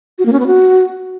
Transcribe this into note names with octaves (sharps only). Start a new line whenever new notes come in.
F#4
A#3
C#4
B3
F#4